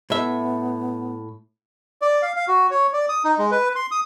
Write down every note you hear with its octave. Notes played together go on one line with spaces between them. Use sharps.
A2 B3 E5
D5
F5
F5
F#4
C#5
D5
D#6
D#4
G#3
B4
C6
D#6